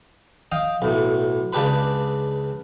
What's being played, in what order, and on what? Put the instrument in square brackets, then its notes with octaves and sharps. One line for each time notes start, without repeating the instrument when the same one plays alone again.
[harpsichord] D#5 F5 G5
B1 A2
C#2 C#3 D4 G4 B4 B5